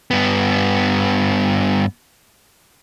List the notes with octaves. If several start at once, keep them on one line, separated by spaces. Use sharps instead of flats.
G2 B3